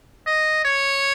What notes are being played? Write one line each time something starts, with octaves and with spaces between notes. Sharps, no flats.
D#5
C#5